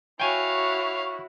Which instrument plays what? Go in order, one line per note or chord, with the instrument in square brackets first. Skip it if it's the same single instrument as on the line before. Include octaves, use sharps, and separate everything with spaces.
[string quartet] E4 F#4 [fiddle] C#5 F5 [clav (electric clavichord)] G5 G#5 [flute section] C#6